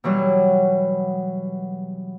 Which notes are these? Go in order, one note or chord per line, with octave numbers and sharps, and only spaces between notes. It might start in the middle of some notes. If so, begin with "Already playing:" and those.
B2 E3 F#3 G3